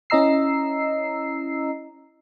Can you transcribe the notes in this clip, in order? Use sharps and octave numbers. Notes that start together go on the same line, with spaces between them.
C#4 E4 D#5 A#5 E6 C7